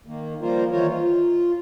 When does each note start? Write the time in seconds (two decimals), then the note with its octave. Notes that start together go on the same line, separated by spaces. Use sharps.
0.06 D#3 A#3
0.42 F3 G3 A#3 F4 A#4 C5
0.71 D#3 E3 F4 A#4 C5 C#5
0.87 F4